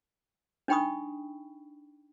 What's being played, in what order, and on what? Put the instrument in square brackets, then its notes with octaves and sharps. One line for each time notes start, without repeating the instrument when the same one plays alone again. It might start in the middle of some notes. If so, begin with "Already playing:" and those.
[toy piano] D4 D#4 G5 B5 C#6 D#6